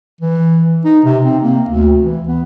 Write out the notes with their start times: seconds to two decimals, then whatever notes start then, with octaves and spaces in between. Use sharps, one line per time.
0.21 E3
0.85 D#4
1.05 C3
1.25 C4
1.42 A#3
1.69 D2
2.03 E3
2.28 B3